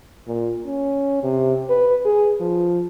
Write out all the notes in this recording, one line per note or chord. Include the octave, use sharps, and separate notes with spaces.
A#2
C#4
C3
B4
G#4
F3